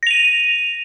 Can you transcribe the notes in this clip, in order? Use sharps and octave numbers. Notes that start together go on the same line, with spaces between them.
A#6 D#7 F7